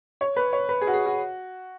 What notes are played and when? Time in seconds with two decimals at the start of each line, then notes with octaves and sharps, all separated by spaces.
0.21 C#5
0.36 B4
0.53 C#5
0.69 B4
0.81 G#4
0.87 F#4
0.94 G#4
1.06 F#4